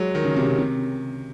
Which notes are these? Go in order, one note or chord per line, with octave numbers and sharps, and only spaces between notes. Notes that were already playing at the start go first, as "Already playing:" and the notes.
Already playing: F#3 G#3
D#3
C#3
C3
C3
C3